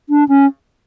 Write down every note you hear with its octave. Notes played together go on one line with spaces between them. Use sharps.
D4
C#4